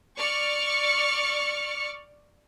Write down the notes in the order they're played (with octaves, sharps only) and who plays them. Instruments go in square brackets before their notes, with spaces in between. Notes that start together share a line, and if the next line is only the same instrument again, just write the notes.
[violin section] D5 C#6 F6 C#7